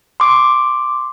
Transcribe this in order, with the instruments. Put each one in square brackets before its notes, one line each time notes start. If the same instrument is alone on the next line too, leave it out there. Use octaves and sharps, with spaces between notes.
[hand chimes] C6 D6